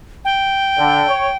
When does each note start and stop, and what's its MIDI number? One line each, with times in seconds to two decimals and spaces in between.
0.25 1.37 79
0.78 1.02 50
1.08 1.26 73